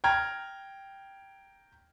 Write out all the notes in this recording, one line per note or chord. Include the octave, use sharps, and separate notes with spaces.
G5 A#5 F6 G#6